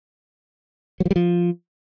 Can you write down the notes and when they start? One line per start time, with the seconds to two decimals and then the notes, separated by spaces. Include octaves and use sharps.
1.00 F#3
1.05 F3
1.11 G3
1.16 F3